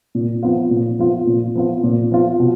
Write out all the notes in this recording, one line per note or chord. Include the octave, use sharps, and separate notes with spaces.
A#2
F3 B3 F4
A#2
F3 B3 F4
A#2
F3 B3 F4
A#2
F3 B3 F4
B2